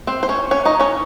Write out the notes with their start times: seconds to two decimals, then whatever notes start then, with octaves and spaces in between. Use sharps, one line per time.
0.07 C4 C5
0.23 C5
0.29 C#4 C#5
0.51 C#4 C#5
0.65 D#4 D#5
0.80 C#4 C#5